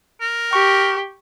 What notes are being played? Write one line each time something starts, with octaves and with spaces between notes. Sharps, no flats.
A#4
G4 C#6